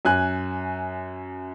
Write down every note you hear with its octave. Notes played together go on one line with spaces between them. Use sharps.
F#2 G#5 F#6